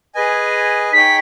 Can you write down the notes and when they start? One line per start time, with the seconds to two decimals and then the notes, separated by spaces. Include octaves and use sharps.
0.15 G#4 B4 D#5 G#5
0.93 D#4 G#4 C#5 G5 B6